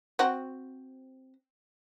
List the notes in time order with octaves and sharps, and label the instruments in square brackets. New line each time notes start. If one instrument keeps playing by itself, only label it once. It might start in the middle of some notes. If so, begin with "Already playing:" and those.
[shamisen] C4 F#4